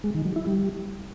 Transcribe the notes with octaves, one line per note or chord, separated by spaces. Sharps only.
G#3
D#3
F#3
E4
G3